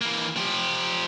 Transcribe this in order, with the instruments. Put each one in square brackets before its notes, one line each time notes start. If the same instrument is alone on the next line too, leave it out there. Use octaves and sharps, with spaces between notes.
[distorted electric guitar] E3 A#3
F3 G4